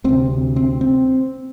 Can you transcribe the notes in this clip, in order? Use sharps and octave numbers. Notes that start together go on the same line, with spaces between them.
D2 C3 C4
C4
C4